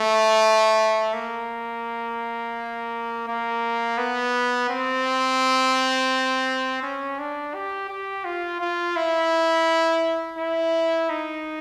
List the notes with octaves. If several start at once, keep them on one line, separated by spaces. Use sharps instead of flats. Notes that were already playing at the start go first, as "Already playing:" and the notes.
Already playing: A3
A#3
A#3
B3
C4
C#4
D4
G4
G4
F4
F4
E4
E4
D#4